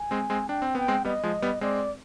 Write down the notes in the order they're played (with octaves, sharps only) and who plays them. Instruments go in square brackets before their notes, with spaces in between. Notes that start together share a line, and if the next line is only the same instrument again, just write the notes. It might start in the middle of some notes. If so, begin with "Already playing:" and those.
Already playing: [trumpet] G#5
[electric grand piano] G#3 C4
G#3 C4
[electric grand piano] D4 [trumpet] G5
[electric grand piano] C4
[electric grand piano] B3 [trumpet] G5
[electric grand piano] G#3 C4
[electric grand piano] G3 B3 [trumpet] D#5
[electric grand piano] F3 G#3
G3 B3
[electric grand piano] G#3 C4 [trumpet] D5